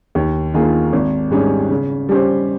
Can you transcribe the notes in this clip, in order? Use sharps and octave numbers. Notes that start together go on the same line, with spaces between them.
D#2
D#3 A#3 F4 G#4
G#1
G#2 G3 C#4 G#4
C#3
G3 C#4 G4 C5